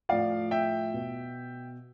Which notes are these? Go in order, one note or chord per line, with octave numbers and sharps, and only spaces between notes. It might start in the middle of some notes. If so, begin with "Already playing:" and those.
A2 F3 D5 F5
E5 G5
B2